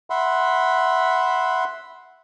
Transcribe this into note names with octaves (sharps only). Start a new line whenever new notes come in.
E5 F#5 B5 C6